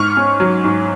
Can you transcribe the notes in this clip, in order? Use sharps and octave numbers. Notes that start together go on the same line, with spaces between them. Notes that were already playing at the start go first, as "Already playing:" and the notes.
Already playing: G#2 C#6 F6
C#4
F#3
G#2